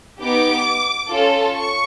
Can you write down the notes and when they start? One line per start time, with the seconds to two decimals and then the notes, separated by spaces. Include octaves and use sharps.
0.21 B3 D#4 G4 D6
1.11 C#4 F4 A4
1.55 C#6